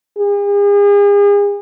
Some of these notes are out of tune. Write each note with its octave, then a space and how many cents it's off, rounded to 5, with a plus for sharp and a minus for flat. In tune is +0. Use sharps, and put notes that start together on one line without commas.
G#4 -40